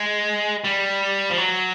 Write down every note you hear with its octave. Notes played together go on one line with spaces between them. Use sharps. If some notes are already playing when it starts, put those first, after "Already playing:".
Already playing: G#3
G3
F3
F#3